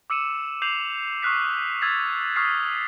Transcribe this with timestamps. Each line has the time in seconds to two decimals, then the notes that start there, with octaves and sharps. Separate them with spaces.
0.10 D6 E6 C#7 D#7 E7
0.62 D6 G6 C7 D#7 F7 F#7
1.23 C#6 D#6 F6 F#6 B6 C7
1.81 E6 G#6 A6 B6 F7
2.36 C#6 D#6 F6 B6 C7